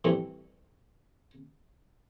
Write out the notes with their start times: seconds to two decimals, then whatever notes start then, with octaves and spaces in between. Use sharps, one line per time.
0.04 E3 G3 A3 C4